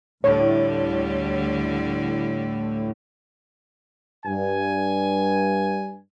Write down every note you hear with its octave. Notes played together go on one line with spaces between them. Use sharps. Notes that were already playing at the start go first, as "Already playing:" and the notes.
D2 A2 D3 G3 C#5
G2 G#5